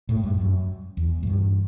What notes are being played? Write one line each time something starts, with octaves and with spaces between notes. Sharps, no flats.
A2
G2
F#2
E2
F#2
G2